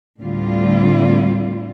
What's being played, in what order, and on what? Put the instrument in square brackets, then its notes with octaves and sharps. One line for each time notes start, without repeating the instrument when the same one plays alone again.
[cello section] D2 A2 D3 G3 C4 F4